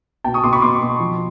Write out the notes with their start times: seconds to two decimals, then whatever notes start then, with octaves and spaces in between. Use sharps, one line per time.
0.24 B2 G5 A5
0.34 C#6 D#6
0.44 B2 C6 D6
0.53 B5 C#6
0.62 B2 C6 D6
0.81 B2
1.00 F3